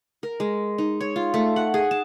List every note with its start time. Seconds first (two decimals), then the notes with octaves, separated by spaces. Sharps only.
0.23 A#4
0.40 G#3
0.78 D#4
1.01 C#5
1.16 F4
1.34 A3
1.56 F#5
1.74 G#4
1.91 A5